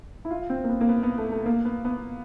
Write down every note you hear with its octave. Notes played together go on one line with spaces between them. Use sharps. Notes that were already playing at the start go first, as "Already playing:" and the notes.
E4
F4
C4
A#3
B3
A#3
B3
B3
A3
A3
A#3
B3
B3